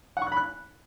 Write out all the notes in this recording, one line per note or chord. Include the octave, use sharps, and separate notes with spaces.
F#5
C#6
F#6
B5
F#6